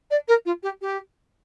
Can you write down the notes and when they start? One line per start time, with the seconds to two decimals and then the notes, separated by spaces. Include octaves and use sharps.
0.10 D5
0.28 A#4
0.45 F4
0.62 G4
0.81 G4